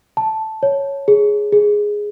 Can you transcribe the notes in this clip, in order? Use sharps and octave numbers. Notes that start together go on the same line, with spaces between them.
A5
C#5
G#4
G#4